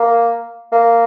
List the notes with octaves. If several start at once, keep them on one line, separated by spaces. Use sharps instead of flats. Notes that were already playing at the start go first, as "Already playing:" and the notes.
Already playing: A#3
A#3